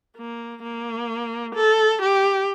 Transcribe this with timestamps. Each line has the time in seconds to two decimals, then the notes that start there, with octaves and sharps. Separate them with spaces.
0.17 A#3
0.63 A#3
1.56 A4
2.02 G4